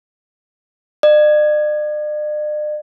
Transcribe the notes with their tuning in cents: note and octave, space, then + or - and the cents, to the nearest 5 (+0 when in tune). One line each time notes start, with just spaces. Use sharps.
D5 +45